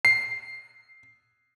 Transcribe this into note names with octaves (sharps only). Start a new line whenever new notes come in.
C7